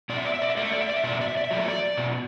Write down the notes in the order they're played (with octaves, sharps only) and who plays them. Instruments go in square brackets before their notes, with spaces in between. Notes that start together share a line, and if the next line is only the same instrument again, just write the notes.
[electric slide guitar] B2 D5
E5
D5
E5
D5
E5
A3 D5
E5
D5
E5
D5
E5
B2 D5
E5
D5
E5
D5
E5
F#3 A3 D5
E5
D5
B2